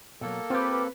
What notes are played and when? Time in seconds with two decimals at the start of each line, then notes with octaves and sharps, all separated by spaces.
0.21 B2 F#3 A#3 A4
0.50 C4 F4 G4 B4